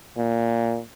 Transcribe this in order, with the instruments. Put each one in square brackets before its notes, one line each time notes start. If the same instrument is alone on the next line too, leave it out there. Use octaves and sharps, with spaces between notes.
[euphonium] A#2